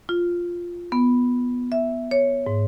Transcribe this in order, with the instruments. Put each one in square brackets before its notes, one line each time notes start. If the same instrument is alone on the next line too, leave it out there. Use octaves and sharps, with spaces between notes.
[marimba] F4
B3
E5
C#5
G#2